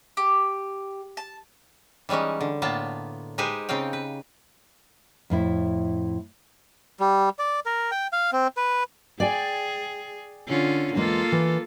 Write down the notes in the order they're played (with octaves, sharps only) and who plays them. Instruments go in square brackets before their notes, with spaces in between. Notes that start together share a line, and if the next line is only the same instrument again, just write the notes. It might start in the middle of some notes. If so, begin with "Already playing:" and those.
[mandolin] G4
A5
[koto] E3 G3 G#3 C#4 D#4
D3
A2 A#3 B3 F4 A5
G#3 D#4 G4 B4 C5 G#5
C#3 C4 D#4 F5 G5
B4
[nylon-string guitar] F2 A2 E4
[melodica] G3
D5
A#4
G5
F5
C4
B4
[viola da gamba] G#4 [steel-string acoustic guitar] D5 G5 G#5
[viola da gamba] D3 C#4 F4
[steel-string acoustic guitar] E2 G#3 [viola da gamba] A#3 F4 A4
[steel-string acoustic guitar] E3